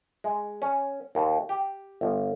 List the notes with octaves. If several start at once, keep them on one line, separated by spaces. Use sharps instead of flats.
G#3
C#4
D#2
G4
G1